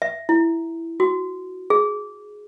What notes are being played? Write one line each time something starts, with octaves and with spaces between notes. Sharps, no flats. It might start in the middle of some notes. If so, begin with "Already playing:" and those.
E5
E4
F#4
G#4